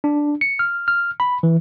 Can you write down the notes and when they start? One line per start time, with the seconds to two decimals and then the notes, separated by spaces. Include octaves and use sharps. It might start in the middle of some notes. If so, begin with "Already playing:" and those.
0.04 D4
0.41 C#7
0.59 F6
0.88 F6
1.20 B5
1.43 E3